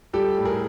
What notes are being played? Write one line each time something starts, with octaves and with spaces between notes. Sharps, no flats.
G3 G4 A4
A2
G#4 A#4